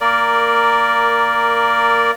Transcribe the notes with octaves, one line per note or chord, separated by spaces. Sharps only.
A#3 A#4 D5